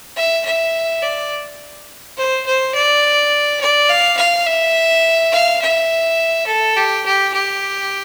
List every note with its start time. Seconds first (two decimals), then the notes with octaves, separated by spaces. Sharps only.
0.16 E5
0.45 E5
1.02 D5
2.17 C5
2.46 C5
2.75 D5
3.61 D5
3.90 F5
4.17 F5
4.47 E5
5.32 F5
5.61 E5
6.47 A4
6.77 G4
7.05 G4
7.33 G4